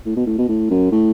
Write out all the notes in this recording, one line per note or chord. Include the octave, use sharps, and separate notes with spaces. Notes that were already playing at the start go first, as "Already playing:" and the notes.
A2
B2
A2
B2
A2
F#2
A2